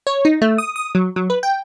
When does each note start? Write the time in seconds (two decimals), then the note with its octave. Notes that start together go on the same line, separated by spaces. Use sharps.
0.07 C#5
0.25 D#4
0.42 A3
0.58 D#6
0.76 D#6
0.95 F#3
1.16 F#3
1.30 B4
1.43 G5